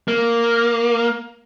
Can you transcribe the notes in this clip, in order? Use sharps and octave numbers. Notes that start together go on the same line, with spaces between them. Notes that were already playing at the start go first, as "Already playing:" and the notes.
A#3